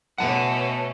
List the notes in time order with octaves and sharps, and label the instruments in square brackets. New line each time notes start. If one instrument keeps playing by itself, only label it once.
[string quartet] B2 A3 C#4 [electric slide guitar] F#5 A5